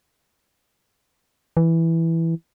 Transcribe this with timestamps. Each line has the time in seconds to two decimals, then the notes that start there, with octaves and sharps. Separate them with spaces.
1.57 E3